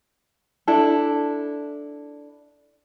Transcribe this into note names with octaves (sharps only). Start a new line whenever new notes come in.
D4 E4 A4